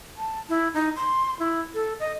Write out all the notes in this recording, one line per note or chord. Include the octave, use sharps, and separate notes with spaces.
A5
E4
D#4
C6
E4
A4
D#5